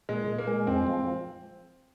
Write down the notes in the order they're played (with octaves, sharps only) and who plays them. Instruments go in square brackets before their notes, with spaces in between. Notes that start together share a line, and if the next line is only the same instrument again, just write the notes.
[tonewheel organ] A#2 [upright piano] G#3
[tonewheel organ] A#2
[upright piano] A#3
[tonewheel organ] G#3
[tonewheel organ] F2 [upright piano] C4
[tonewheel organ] F3